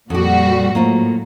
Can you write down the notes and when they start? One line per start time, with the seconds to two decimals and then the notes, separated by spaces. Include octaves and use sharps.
0.10 F2 A#2 G3 F#4 G4
0.75 A2 F#3 A#3 F4 C5